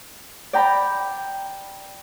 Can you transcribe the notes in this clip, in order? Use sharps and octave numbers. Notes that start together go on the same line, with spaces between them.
D5 G5 A#5 B5